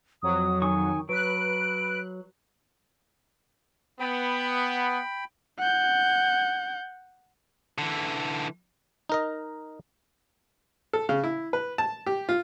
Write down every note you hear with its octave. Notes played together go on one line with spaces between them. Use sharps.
F2 F#3 D#6
D#3 G#5 C#6 D#6
F#3 B4 F#6 D7
B3 G5 B5
F#5 G6
D3 E3
D#4 A#4 D#5
A4
C#3
E4
B4
A5
G4
F4